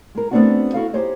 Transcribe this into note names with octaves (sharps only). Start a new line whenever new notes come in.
G#3 A#4
A3 B3 C4 D4 D#4 F#4
E4 F#4 A4 F5
D#4 G4 G#4 C5 C#5 D#5